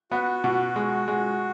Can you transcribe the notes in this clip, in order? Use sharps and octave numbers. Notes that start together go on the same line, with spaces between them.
B3 F#4
B2
G#3
G#3